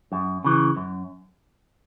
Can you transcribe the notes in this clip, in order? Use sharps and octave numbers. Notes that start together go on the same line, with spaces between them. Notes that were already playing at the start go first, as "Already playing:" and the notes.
F#2
C#3 E3
F#2